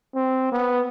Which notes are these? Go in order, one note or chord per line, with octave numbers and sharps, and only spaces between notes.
C4
B3